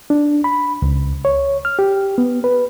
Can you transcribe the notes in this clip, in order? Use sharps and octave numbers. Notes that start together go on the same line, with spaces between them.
D4
B5
C#2
C#5
F6
G4
B3
B4